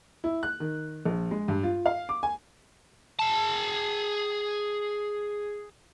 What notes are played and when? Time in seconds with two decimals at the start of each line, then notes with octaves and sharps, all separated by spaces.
0.24 E4
0.43 F#6
0.60 D#3
1.05 A#1
1.31 G#3
1.48 G2
1.63 F4
1.86 F5
2.09 D6
2.23 G#5
3.19 G#4 A5